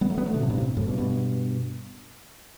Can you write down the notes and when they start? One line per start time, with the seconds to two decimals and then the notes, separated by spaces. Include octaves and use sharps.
0.01 G3 B3
0.10 F#3 A3
0.18 G3 B3
0.26 F#3 A3
0.34 B2 D3
0.42 A2 C3
0.50 G2 B2
0.58 A2 C3
0.77 F#2 A2
0.87 G2 B2
0.98 G2 B2